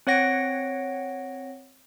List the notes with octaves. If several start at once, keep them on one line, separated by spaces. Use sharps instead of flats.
C4 C#5 F#5 A#6 C#7 D7